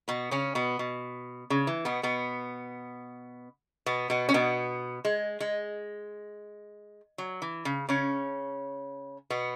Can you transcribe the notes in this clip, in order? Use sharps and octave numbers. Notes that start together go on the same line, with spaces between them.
B2 B3
C#3 C#4
B2 B3
B2
C#3
E3
B2 B3
B2 B3
B2 B3
B2 B3
C#4
B2 B3
G#3
G#3
F#3
E3
C#3
C#3 C#4
B2 B3